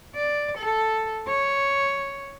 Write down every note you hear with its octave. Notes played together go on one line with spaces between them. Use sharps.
D5
A4
C#5